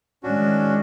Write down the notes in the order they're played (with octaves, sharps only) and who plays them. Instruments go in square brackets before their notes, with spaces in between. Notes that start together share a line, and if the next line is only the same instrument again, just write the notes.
[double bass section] A2 D#3 G#3 [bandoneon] C#4 D4 F#4